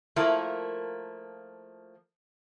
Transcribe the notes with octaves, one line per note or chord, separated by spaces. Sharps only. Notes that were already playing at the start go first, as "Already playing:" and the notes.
F3 A3 A#3 E4 A#4